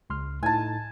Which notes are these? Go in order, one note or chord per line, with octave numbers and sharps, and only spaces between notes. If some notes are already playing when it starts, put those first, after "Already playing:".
C#2 C6 F6
A2 D#4 G#5 A5